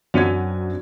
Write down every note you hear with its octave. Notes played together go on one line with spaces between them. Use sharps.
F#2 F#3 C4 D4 F#4 G#6